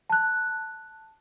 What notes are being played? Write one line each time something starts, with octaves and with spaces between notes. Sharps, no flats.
A5 F#6